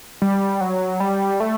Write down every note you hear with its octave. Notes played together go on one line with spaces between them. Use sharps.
G3
F#3
G3
A3